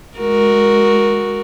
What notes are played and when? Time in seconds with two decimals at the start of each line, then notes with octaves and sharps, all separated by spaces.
0.18 G#3 F#4 A#4